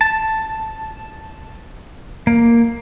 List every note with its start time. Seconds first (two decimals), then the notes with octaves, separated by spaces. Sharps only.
0.01 A5
2.27 A#3